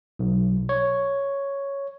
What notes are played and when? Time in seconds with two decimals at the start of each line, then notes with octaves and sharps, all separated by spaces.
0.19 B1
0.69 C#5